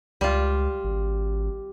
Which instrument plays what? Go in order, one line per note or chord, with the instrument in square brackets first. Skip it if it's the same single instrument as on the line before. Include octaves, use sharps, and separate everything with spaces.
[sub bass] C#2 [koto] G3 F4
[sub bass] G#1